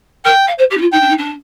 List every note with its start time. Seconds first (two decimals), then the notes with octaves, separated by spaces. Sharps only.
0.24 A#4 G5
0.47 F5
0.58 C5
0.70 G4
0.77 D#4
0.81 F4
0.92 D#4 G5
1.01 D4
1.09 D#4
1.17 D4